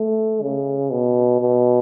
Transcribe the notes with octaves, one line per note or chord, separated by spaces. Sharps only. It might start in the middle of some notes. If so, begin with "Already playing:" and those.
Already playing: A3
C#3
B2
B2